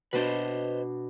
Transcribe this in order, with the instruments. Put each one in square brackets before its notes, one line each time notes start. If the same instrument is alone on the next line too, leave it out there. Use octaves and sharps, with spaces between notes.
[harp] B2 D4 [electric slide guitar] B4 C5 D#5